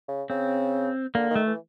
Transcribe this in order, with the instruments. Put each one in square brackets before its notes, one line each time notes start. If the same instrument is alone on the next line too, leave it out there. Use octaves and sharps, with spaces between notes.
[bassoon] C#3
[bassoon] C#3 [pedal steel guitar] C4
[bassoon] D3 [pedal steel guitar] A#3
[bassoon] D#3 [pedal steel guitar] A3
[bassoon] E3